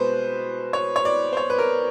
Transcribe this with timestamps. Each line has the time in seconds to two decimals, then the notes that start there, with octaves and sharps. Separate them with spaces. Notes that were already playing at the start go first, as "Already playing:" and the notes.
Already playing: B2 G#3 B4 C5
0.73 C#5
0.96 C#5
1.05 D5
1.33 C5
1.37 C#5
1.50 B4
1.58 A#4